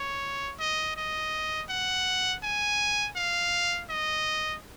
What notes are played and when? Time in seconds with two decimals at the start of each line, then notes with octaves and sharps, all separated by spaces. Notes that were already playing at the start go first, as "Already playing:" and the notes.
Already playing: C#5
0.60 D#5
0.96 D#5
1.69 F#5
2.43 G#5
3.16 F5
3.90 D#5